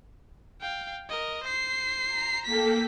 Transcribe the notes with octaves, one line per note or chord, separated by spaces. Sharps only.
F5 G5
A#4 D#5
C5 C7
A#5
A#3 A4 G5 B6